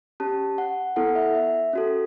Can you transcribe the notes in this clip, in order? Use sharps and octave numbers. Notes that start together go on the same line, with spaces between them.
C#4 G4 A5
F#5
B3 E4 A4 F#5
E5
E5
C#4 F#4 A4